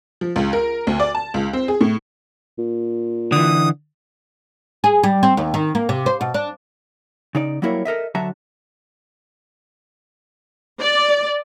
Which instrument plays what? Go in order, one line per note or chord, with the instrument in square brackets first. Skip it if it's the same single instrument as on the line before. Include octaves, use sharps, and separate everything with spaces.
[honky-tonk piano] F3
C#2
A#4
D2
D5
A5
C#2
C4
G#4
A2
[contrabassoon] A#2
[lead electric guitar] D3 E3 [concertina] D#6
[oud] G#4
G3
C4
D#2
D#3
A#3
C3
C5
B2
D4
[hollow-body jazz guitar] C#3 D#4 D5
F#3 G3 A#3 E4 A#4 C#5
A4 A#4 D#5 E5
D3 F#3 F#4 E5 A5 A#5
[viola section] D5